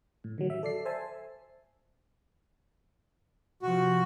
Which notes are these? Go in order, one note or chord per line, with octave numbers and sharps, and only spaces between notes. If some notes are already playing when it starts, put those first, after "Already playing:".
A2
D3 D#3 F#3
E5
A4 D5 C7
C5 E5 G#5 A5
C3 F3 F#4